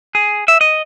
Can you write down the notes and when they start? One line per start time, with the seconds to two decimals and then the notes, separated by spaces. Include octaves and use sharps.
0.15 G#4
0.48 E5
0.61 D#5